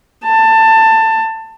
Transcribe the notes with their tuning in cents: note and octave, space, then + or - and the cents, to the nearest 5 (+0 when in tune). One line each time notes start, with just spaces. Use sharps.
A5 +20